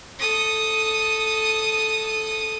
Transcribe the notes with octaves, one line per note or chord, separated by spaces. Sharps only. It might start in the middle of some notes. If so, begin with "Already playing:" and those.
A4 D#6